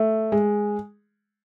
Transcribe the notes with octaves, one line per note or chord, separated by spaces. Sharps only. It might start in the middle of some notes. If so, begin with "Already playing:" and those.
Already playing: A3
G#3